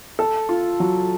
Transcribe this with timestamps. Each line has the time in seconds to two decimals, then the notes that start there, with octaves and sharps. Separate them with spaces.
0.19 A4
0.49 F4
0.80 F#3